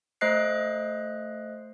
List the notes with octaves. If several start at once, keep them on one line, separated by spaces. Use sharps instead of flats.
A3 C5 D#5 F#6 C7